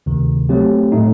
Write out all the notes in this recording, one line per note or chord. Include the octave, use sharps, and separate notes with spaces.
D2 C3 D#3
F#3 A3 C4 G4
A2 A3 D#4